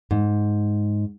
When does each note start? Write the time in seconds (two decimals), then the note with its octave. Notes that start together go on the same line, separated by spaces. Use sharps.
0.11 G#2